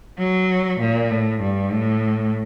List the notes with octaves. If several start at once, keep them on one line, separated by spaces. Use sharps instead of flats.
F#3
A#2
A2
G2
A2